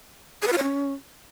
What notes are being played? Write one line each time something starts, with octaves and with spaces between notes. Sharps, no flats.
G#4
B4
F4
C#5
C#4